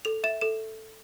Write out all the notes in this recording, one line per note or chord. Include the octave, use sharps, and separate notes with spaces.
A4 F7
E5 E7
A4 E7